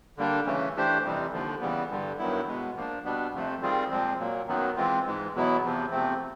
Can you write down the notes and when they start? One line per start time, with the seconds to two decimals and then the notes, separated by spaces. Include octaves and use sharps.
0.17 D3 G3 A#3 D4
0.46 C#3 E3 A3 C#4
0.75 E3 A3 D4 G4 C5
1.04 F2 C3 E3 G3
1.33 D#2 D3 F3
1.61 C#3 E3 G3 B3
1.90 G2 D3 G3
2.18 G2 D#3 F#3 B3 E4
2.47 B2 G#3 B3
2.76 F3 A#3 D4
3.04 B2 G3 B3 D4
3.33 F2 C3 F3 A3
3.62 D#3 G3 C4 F4 G#4
3.90 A#2 F3 G#3 C4
4.19 A#2 F#3 A#3
4.47 F#2 D#3 F#3 B3
4.76 E3 G#3 C4 F4
5.05 G#2 E3 G#3
5.34 E2 B2 F#3 B3 E4
5.63 E2 C3 F3
5.91 E2 C3 F3 A3 C4